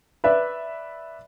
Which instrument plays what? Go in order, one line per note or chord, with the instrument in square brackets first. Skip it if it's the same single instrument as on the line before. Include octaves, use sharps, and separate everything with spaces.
[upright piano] B4 D5 E5